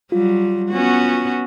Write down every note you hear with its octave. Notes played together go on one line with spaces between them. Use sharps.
F#3 G3 F4
B3 C#4 F#4